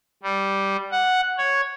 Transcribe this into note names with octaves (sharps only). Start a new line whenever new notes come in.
G3
F#5
C#5